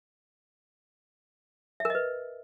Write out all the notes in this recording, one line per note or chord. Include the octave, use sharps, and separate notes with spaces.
A#4 B4 D#5 E5